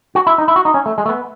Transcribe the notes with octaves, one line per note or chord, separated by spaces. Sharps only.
F#4
E4
D#4
E4
F#4
D#4
C#4
A3
G#3
A3
B3